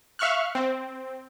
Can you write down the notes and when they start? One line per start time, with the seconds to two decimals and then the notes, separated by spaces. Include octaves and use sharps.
0.19 E5 F5 C#6 F6 F#6
0.55 C4